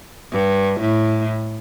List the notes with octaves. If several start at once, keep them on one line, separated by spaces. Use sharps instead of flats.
G2
A2